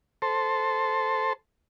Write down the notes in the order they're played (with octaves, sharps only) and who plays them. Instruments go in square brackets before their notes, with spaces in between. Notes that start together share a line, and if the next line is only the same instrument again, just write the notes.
[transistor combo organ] A4 C5